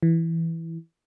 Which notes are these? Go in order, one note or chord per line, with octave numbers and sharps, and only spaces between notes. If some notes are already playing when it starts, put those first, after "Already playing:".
E3